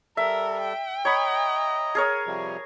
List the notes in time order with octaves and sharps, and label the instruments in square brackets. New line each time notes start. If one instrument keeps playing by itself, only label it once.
[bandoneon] G3 A4 [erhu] A#4 [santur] E5
[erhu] G5
[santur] C#5 B5 [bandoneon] D#5 A#5
[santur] G#4 A#4 C#5
[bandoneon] C3 F3 G3